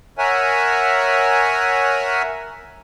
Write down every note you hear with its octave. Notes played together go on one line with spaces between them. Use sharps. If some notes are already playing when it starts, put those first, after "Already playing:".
A#4 C#5 E5 F#5 G#5